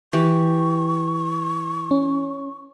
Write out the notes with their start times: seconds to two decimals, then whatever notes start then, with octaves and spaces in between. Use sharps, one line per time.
0.13 E3 G4 C#6
1.91 C#4